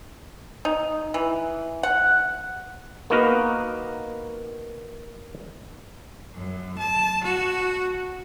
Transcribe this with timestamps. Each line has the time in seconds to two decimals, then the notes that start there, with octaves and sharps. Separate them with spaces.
0.65 D#4
1.14 E3
1.83 F#5
3.10 A#3 B3 D#4 F#4 A#4 B4
6.34 F#2
6.78 A5
7.23 F#4